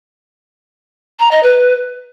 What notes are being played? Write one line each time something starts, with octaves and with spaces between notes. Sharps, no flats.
A#5
D#5
B4